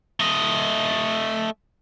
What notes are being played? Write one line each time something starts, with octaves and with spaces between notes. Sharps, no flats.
A3 D#5